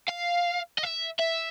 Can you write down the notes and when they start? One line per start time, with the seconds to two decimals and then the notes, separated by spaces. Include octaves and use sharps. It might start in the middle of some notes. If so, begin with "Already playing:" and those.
0.09 F5
0.78 D#5
0.83 E5
1.20 E5